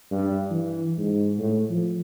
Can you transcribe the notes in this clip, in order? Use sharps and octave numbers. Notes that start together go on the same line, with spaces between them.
G2
E3
G#2
A2
F3